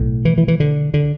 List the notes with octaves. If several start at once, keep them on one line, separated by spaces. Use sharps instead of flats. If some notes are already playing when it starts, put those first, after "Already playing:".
Already playing: B1 A2
E3
E3
E3
D3
D3